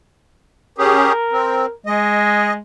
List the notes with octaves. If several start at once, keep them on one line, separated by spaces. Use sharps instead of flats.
C#4 G4 G#4 A#4
C4
G#3 D#5